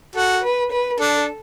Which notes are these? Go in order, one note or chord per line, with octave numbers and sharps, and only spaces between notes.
F#4 A4
B4
B4
D4 A4